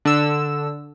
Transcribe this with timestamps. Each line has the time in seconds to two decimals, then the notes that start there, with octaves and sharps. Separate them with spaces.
0.05 D3 E6